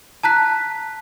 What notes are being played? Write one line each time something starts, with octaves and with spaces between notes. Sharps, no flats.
A5 A#5 F#6 B6